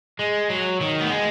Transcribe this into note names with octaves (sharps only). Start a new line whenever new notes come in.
G#3
F#3
D#3
B3
G#3